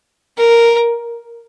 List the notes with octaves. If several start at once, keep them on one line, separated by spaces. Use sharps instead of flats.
A#4